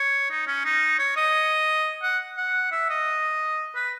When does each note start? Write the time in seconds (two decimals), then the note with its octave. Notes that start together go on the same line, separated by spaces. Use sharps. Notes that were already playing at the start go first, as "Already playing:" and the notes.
Already playing: C#5
0.31 D#4
0.47 C#4
0.65 D#4
0.99 C#5
1.17 D#5
2.03 F#5
2.37 F#5
2.72 E5
2.90 D#5
3.75 B4